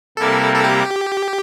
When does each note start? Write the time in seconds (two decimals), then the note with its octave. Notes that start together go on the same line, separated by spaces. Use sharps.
0.17 C3 G3 A#3 E4 A4 A#4
0.55 A4
0.64 G4